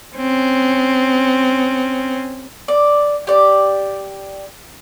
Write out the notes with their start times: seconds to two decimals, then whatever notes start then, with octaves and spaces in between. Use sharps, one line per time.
0.17 C4 C#4
2.68 D5
3.27 G4 D5